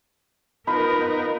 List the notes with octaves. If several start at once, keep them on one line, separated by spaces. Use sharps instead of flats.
B3 D#4 F4 A#4 B4 B5